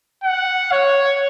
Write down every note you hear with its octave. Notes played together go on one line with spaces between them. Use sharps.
F#5
C#5